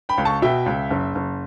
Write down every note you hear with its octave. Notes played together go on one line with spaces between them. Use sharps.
G5 B5
C#2
A5 C#6
B2 E5 G5
C#2
F#1
F#1